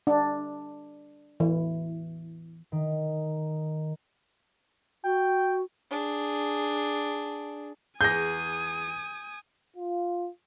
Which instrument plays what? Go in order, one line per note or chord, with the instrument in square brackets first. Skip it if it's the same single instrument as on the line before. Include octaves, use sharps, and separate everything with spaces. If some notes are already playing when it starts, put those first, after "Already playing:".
[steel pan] D4
E3
[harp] D#3
[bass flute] F#4 [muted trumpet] G5
[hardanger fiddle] D4 G#4
[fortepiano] E2 G#4 [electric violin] G#5 D#6 [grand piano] G6 A#6
[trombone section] F4